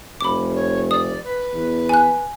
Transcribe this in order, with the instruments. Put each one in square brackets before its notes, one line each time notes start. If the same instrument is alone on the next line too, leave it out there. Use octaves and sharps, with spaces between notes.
[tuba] F1 [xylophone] B5 D6
[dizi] C#5
[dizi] D5 [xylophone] D#6
[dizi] B4
[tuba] E2
[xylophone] G#5 F#6